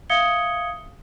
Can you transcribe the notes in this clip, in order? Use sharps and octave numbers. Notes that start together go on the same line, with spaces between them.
E5 F5 D#6 G#6 C#7 G7